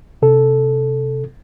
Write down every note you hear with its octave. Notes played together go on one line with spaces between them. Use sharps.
C3 A4